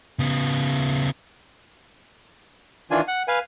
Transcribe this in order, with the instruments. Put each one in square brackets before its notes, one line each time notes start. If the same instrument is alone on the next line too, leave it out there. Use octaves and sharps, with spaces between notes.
[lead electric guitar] C#3 B3
[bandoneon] D#3 E3 D4 F4 G#5
F#5
B4 F5 G#5